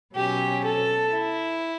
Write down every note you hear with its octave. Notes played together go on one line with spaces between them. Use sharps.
B2 F#3 C#4 G4
A4
E4